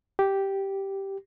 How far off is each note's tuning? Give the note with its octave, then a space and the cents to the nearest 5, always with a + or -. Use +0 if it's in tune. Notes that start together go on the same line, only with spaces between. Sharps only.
G4 -5